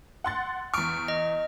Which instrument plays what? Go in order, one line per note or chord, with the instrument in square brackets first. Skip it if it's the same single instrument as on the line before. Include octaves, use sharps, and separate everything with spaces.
[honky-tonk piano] F#5 C6 A6
[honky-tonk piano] E2 C#6 [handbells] F6 D7
[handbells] D#5